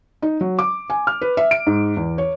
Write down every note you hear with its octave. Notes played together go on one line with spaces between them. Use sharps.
D#4
F#3
D6
G#5
F6
B4
E5
D7
G#2
E2
C#5